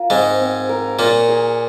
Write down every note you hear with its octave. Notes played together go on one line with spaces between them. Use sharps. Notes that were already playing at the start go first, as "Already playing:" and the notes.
Already playing: F4 A#4
G#2 G#3 C4
C4
A#4
A#2 A#3 C#5
G#4